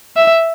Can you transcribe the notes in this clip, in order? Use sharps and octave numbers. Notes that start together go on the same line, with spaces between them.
E5